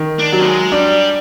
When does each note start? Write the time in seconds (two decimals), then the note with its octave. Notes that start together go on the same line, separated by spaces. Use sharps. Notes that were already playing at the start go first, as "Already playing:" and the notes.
Already playing: D#3
0.19 D4
0.32 F#3
0.46 G#3
0.72 G3 D4